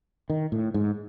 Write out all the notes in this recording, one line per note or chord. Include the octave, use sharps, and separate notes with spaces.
D#3
A2
G#2